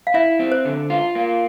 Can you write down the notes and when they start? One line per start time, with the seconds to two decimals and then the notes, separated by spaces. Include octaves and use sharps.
0.07 F5
0.14 E4 E5
0.39 C4
0.52 C5
0.65 D3
0.90 F4
1.15 A#3